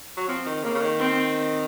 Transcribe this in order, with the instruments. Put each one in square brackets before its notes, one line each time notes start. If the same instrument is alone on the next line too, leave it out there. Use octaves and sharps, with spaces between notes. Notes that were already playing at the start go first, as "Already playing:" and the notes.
[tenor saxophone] F#3
[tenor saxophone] F3 [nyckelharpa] C4
[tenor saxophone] D#3
[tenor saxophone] C#3 [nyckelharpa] A#3
[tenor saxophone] C#3
D#3
[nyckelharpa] C4